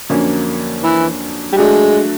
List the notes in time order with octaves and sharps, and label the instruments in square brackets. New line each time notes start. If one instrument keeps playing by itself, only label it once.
[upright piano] F2 D3 F#3 A#3 C#4
[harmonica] E3
G3
[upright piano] F#3 A3 D4 F#4 [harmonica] G#3